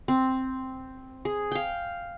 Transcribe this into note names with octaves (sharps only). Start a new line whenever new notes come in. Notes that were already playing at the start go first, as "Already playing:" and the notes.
C4
G#4
F5 G5